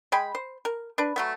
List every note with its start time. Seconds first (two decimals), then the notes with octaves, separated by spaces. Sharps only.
0.12 G#3 G5 G#5 B5
0.35 C5
0.65 A#4
0.98 D4 B4
1.16 F#3 A3 B3